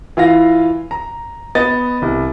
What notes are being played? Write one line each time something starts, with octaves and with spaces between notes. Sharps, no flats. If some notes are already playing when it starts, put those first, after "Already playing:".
E3 F4 F5 A#6
A#5
B3 D#5 A6
C2